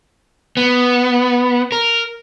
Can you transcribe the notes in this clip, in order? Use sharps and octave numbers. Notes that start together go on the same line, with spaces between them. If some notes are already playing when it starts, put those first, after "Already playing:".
B3
A#4